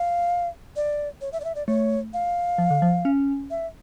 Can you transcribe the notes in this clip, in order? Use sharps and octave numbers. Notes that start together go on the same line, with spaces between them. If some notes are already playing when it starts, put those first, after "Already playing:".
Already playing: F5
D5
C#5
E5
D5
E5
D5
A3 C#5
F5
F3
D3
F3
C#4
E5